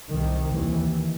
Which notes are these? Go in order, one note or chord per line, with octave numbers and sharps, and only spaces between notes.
C2 C3 D#3
D#2 E3